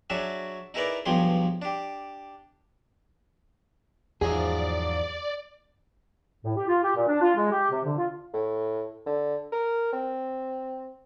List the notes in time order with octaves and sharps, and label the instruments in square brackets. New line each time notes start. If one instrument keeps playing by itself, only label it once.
[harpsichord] F#3 D4 F#4 G#4 E5
D#4 E4 G#4 A#4 B4 D5
B1 G2 F3 G4 G#4 C6
D4 G4
[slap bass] E2 [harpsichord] G#2 F3 F#3 [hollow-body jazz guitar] G#4 [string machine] D5
[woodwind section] A2
G4
F4
G4
A#2
D4
F4
G#3
G4
C3
D3
F4
[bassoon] A2
D3
A#4
C4